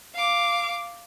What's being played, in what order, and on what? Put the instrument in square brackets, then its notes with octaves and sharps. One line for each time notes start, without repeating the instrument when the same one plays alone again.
[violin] F5 D6